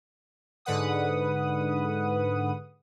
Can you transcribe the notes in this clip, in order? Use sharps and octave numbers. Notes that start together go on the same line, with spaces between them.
G#2 D3 B4 F#5 D#6